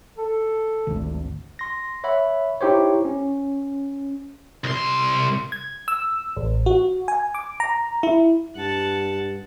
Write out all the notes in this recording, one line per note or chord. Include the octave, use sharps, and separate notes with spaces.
A4
G#1 D2
C6 A#6
C#5 E5 F#5 B5
D#4 E4 G4 C5 C#5
C#4
C2 C6
G#6
E6
A1
F#4
G#5
D6
A#5
E4
G2 F#5 A5